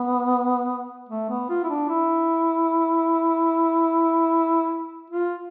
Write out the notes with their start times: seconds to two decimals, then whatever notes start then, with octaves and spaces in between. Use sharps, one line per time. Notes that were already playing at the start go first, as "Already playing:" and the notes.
Already playing: B3
1.09 A3
1.30 B3
1.49 F4
1.64 E4
1.69 D4
1.89 E4
5.10 F4